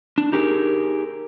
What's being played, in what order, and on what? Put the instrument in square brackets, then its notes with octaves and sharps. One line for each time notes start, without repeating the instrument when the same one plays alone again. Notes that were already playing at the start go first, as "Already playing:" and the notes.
[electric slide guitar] D4
D#4 G4 G#4 A#4